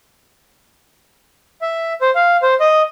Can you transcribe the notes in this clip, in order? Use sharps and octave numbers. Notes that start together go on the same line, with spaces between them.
E5
C5
F5
C5
D#5